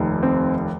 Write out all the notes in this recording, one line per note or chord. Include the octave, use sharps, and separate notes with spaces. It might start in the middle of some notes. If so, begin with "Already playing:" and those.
Already playing: F1 D#2 D#3
C4